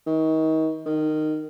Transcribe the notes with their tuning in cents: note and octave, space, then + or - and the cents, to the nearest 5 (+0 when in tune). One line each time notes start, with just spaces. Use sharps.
D#3 +30
D#3 -15